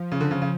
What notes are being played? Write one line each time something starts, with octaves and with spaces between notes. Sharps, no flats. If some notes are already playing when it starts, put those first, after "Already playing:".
Already playing: F3
C#3
D3
C#3
C#3